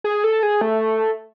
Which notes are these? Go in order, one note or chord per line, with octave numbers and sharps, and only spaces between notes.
G#4
A4
G#4
A3